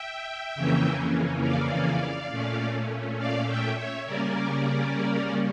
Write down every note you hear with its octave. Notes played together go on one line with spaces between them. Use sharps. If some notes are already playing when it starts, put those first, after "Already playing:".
Already playing: E5 G5
F2 C#3 E3 A#3 C#4
D5 F5
A#2 A3 C#4
D5 F5
E5 G5
C#5 E5
C#3 G3 A#3 C#4 A#4 D5